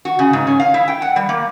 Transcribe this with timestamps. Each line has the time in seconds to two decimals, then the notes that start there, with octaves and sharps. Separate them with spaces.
0.05 F#4
0.19 C#3
0.33 G#2
0.47 C#4
0.60 F5
0.74 E4
0.88 G5
1.02 F#5
1.16 G3
1.29 A#3